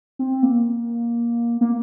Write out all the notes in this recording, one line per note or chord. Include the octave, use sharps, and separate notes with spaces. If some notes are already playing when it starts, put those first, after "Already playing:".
C4
A#3
A#3